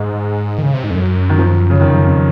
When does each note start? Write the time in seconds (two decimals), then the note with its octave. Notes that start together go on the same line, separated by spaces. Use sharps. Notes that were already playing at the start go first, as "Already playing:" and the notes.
Already playing: G#2 G#3
0.59 D#3
0.63 C#3
0.74 C3
0.84 G#2
0.90 F2
0.95 F#2
1.30 D#3
1.38 F3
1.70 C#3
1.81 F2 D#3
1.93 F#2
2.06 F2